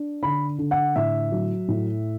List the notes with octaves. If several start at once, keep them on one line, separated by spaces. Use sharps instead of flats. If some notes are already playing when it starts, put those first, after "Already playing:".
Already playing: D4
D3 B5
D3
F#5
A2 E5
F#3
A2